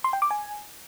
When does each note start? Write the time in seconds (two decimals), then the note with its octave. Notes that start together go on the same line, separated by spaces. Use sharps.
0.04 C6
0.13 G5
0.22 D6
0.31 G#5